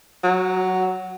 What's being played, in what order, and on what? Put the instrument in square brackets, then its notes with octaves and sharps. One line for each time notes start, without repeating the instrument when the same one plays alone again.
[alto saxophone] F#3